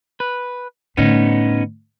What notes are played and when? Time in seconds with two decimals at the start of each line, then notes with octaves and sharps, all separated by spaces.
0.20 B4
0.97 A2 D3 B3 C#4 D#4